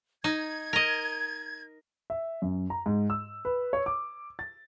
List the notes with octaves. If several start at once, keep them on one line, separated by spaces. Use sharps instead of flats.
D#4 G#6
A#4 D#5
E5
F#2
A#5
G#2
E6
B4
C#5
D6
A6